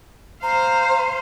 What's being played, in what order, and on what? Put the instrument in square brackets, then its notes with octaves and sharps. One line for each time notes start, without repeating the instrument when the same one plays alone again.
[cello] C5 F5 [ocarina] A#5